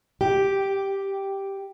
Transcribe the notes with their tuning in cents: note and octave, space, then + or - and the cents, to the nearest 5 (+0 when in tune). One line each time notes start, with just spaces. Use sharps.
G4 +0